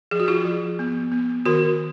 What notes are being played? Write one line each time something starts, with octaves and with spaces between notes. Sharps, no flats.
F3 G#4
F#4
F4 G#4
F3
B3
B3
D#3 F#4 A#4